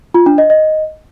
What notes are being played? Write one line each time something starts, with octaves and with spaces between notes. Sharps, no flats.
F4
D4
D#5
D#5